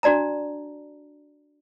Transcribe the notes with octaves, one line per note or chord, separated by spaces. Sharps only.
D4 F#4 D5 A5 A#5